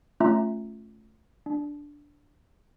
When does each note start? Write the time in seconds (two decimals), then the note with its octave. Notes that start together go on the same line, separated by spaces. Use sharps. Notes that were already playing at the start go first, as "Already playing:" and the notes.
0.20 A3 C#4 F4 E5 A#5
1.46 D4